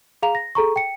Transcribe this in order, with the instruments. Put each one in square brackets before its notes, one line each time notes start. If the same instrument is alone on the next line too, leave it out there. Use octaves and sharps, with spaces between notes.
[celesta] G#4 F5 A#5 F7
A#6
G#4 A4 A#5 C#6
G5 C#7